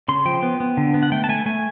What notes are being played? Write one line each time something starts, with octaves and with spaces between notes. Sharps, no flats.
C#3 C6
F3 G5
B3
B3
D3
B3
F#5
A3 G5
A5
A3 G#5
A3 G#5